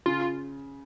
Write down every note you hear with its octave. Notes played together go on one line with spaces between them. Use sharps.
C#3 F4